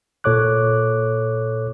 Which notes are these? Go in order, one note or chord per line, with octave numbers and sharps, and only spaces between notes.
A#2 A4 C#5 D6 F#6